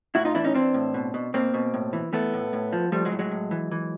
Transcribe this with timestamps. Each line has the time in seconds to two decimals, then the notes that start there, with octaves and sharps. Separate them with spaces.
0.15 A2 E4 F#4
0.25 D#4 F4
0.35 E3 D4 E4
0.44 C#4 D#4
0.54 E3 C4 D4
0.74 A2
0.94 B2
1.14 B2
1.34 B2 A#3 C4
1.54 B2
1.74 A2
1.93 E3
2.13 E3 A3 B3
2.33 A2
2.53 A2
2.73 F3
2.92 F3 G3 A3
3.05 F#3 G#3
3.12 A2
3.19 F#3 G#3
3.31 A2
3.51 E3
3.71 E3